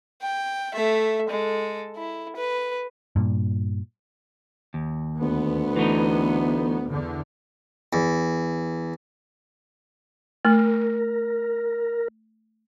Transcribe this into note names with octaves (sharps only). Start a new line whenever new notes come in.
G5
A3 E5
G#3 A4
E4
B4
G2 A#2
D#2
D2 B3
E3 A3 D#4
E2 D3
E2
A3 A#4